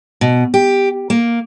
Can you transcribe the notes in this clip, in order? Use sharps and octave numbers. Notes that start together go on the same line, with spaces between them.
B2
G4
A#3